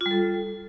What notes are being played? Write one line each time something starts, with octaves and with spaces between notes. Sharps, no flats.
F4
G3
A4